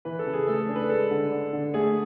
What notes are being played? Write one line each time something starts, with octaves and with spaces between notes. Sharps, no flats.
E3 B4
A4
C#3
G#4
A3 A4
A4
D4
B4
G#3 A4
D3
D4
D3
A3 G#4